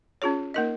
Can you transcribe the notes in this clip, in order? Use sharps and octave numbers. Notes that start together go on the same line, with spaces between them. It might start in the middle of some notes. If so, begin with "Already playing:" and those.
C#4 F4 G#4 C#5
A#3 D#4 A#4 D#5